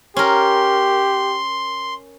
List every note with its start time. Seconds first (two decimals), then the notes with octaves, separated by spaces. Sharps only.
0.17 C#4 G4 A#4 C6